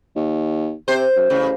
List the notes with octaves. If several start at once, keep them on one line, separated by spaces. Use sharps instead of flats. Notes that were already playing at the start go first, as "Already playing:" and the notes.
D#2
C3 C5
F#2
A1 C#3